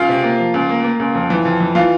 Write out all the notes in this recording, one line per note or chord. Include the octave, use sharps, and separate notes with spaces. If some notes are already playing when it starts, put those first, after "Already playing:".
Already playing: C#2 F4 F5
C3
A#3
F3
C#2
A#3
A#3
C#2
F2
E3
F2
E3
E3 F4 F5